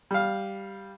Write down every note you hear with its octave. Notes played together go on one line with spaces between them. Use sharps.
G3 F5